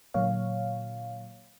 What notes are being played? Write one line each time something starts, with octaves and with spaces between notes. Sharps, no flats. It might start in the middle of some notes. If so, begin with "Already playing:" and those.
A#2 D3 F#3 A#3 C#5 F5